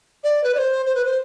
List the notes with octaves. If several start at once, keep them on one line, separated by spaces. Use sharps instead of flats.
D5
B4
D5
C5
C5
B4
C5